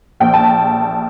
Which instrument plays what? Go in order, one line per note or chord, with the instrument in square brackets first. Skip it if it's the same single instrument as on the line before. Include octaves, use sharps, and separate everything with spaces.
[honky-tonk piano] A#1 G5
A5